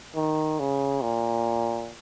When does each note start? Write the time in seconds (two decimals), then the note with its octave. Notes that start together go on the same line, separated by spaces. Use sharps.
0.15 D#3
0.60 C#3
1.03 A#2